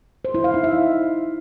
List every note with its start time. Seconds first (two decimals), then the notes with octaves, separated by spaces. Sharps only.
0.25 C5
0.34 E4
0.44 F5
0.54 D#4
0.64 E5